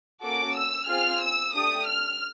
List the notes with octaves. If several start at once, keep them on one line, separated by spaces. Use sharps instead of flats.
A#3 C#4 F#4 A4 D6
E6
C4 F4 G#4 F6
E6
A3 D4 G4 D#6
F6